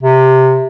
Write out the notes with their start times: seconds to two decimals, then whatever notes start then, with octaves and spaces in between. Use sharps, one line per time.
0.03 C3